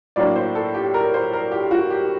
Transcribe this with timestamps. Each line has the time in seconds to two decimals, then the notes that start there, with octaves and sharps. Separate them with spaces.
0.16 A2 F#3 A#3 D4 D5
0.36 C5
0.55 A4
0.74 G4
0.94 A#4
1.14 C5
1.33 A#4
1.52 G4
1.71 F#4
1.90 G4